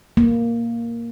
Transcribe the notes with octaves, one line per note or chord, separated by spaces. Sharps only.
A#3